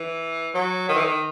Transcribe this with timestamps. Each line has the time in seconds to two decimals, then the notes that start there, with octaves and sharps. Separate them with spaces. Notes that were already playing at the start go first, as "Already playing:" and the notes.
Already playing: E3
0.54 F#3
0.89 D#3
0.97 E3
1.05 D#3